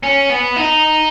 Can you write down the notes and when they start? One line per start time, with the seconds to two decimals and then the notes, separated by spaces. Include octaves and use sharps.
0.04 C#4
0.30 B3
0.57 D#4